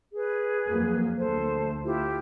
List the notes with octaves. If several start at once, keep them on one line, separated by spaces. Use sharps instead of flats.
G#4 B4
F2 F#3 A#3
D2 A4 C5
E4 F4 G4